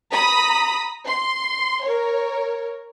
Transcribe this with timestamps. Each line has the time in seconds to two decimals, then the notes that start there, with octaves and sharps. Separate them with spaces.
0.12 A#5 B5 D#6 B6
1.06 C6
1.84 A#4 C#5